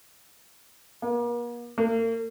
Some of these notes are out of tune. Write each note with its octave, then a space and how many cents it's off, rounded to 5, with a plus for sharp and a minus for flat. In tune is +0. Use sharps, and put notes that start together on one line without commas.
A#3 +40
A#3 -40